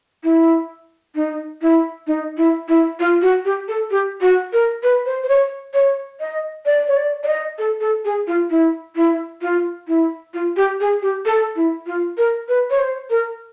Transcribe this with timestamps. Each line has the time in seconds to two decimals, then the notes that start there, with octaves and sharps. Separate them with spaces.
0.24 E4
1.15 D#4
1.62 E4
2.07 D#4
2.37 E4
2.68 E4
3.00 F4
3.22 F#4
3.45 G4
3.68 A4
3.91 G4
4.21 F#4
4.53 A#4
4.83 B4
5.06 C5
5.24 C5
5.29 C#5
5.74 C#5
6.20 D#5
6.66 D5
6.88 C#5
6.96 D5
7.23 D5
7.27 D#5
7.58 A4
7.81 A4
8.05 G#4
8.27 F4
8.50 E4
8.96 E4
9.42 F4
9.88 E4
10.34 F4
10.57 G4
10.80 G#4
11.02 G4
11.26 A4
11.56 E4
11.86 F4
12.17 A#4
12.49 B4
12.70 C#5
12.79 C5
13.10 A#4